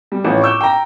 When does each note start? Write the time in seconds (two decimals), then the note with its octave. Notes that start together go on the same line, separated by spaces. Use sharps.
0.12 G3
0.25 A1 F3 C#5
0.41 C#6 D6 E6 G6
0.61 G5 A#5